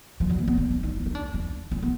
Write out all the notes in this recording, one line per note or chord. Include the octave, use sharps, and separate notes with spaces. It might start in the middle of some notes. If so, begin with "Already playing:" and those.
F3
F#3
A#3
B3
D4
D4
D#4
D4
D#4
D4
D4
D4
B3